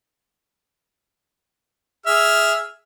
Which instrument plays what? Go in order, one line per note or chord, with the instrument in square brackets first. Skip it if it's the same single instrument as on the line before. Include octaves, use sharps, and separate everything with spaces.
[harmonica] G#4 E5 F6